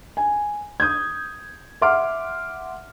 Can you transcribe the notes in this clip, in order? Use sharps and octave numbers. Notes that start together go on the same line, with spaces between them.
G#5
D#6 G6 G#6
E5 F#5 C6 D6 F6